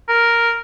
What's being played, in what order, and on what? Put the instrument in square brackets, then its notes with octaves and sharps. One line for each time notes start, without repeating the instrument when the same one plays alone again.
[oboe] A#4